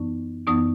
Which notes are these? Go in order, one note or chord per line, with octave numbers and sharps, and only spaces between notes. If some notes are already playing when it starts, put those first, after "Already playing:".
Already playing: F#2 E3 B3 D#4
F#2 E3 B3 D#4 D#6